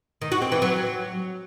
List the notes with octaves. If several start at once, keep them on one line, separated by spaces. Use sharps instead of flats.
D#3
F#4
C4
E3
F#3